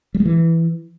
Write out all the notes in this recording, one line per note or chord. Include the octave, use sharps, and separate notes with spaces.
G3
G#3
E3